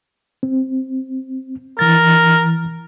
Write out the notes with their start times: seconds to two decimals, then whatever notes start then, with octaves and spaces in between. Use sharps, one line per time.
0.43 C4
1.79 E3 A#4 A6